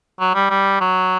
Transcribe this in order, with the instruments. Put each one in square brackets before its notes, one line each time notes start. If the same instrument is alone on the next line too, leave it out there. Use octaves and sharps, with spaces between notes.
[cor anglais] F#3
G3
G3
F#3